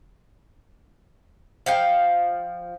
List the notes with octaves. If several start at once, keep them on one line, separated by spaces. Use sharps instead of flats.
F3 F5 G5